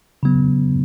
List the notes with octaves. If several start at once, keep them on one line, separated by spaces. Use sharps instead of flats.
C#3 F#3 B3